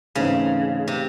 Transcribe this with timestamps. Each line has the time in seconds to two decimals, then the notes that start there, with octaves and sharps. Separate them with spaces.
0.15 G#2 C#3 E3 A3 C4 D#4
0.88 C3